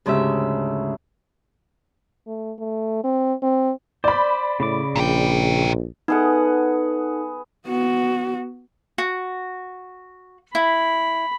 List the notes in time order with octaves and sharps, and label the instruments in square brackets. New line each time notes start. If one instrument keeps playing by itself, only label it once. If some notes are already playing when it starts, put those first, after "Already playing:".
[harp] D2 G#2 C#3 G4 E5
[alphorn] A3
A3
C4
C4
[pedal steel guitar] C5 [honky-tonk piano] D5 B5
[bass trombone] A2 [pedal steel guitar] C#3 D6
[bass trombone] A#1 [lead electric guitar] A#2 G5
[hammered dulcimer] B3 G#4 F#5 [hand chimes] D#4 A4
[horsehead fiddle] B3 F#4
[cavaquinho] F#4
[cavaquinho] E4 [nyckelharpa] B5